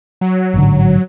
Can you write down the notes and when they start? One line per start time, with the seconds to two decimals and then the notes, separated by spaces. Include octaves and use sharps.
0.21 F#3
0.54 A1 G#2 D3